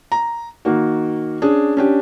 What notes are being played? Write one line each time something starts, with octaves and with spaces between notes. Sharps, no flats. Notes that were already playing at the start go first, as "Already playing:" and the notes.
A#5
D#3 A#3 F#4
C#4 D4 G#4
C#4 D4 G4